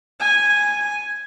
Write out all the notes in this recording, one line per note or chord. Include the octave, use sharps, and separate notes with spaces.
G#5